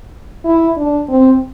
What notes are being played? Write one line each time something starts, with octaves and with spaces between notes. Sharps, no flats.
E4
D4
C4